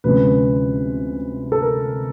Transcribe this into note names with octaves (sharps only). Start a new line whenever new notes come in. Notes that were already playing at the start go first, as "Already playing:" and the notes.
D2 C3 F3 G#3 C#4 B4
A4
A#4